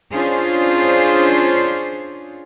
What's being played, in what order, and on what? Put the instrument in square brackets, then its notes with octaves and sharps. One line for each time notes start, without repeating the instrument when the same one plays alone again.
[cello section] C#4 D4 F4 G#4 C5